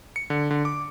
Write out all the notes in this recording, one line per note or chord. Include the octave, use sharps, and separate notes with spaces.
C#7
D3
D3
D6